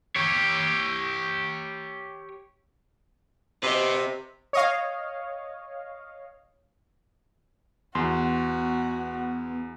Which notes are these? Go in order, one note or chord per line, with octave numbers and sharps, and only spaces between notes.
G4 C#5
C3 B4 D#5
C#5 D#5 F5
E2 B3 F#4 C6